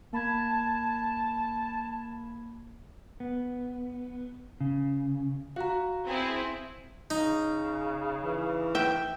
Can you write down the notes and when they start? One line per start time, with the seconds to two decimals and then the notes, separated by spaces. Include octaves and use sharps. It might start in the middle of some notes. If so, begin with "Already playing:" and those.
0.13 A#3 A5 B5 G#6
3.20 B3
4.61 C#3
5.56 F#4 F5 A#5
6.07 C4 E4 G#4
7.10 C#3 D#4
8.25 E3
8.75 E5 G5